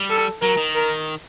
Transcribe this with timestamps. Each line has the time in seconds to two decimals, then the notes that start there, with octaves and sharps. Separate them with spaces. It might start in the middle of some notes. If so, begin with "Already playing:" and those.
Already playing: G3
0.09 A4
0.41 F#3 A#4
0.57 D#3
0.75 A#4